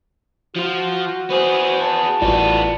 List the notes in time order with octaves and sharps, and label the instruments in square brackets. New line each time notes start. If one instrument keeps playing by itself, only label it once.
[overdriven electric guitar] F3 F4 [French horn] F#4
[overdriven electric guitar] B3 G#4 [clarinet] C5
[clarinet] A5
[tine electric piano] A1 F4 D5 [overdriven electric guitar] A2 B3